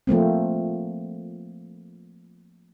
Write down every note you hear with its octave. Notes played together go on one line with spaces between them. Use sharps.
F3 A3 A#3 C4